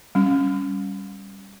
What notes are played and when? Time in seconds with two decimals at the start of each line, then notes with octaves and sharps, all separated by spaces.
0.15 G3 C#4